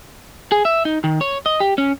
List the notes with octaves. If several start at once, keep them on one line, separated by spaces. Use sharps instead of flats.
G#4
E5
D#4
D#3
C#5
D#5
G4
C#4